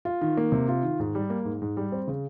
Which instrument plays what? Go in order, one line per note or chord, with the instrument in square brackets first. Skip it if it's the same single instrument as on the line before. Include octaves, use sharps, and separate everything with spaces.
[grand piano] F4
D#3
A#3
C3
F4
D#3
G#2
G3
A#3
G#2
G#2
G3
C4
C#3